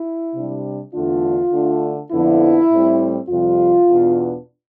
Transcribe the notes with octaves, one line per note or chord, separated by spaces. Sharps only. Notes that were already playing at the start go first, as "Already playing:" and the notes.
Already playing: E4
C3 G3 D4
E2 D3 A3 D4 F4
D3 A3 D4
F2 D3 F3 B3 D4 E4
A2 G3 C4
F2 C3 G3 F4
E2 B2 B3 D4